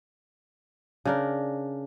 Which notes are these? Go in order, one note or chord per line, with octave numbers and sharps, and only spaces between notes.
C#3 D4 A#4